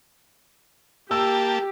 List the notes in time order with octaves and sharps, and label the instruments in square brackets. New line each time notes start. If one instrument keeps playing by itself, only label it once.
[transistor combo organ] A#3 G5 A5 [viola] G4 [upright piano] E6